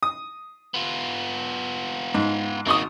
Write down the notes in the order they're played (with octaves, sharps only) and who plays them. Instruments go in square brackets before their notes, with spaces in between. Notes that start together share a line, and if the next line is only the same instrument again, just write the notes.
[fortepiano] D#6
[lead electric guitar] B3 F4
[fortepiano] G#2
[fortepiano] G#1 C#6 D#6 [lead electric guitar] A#3 F#4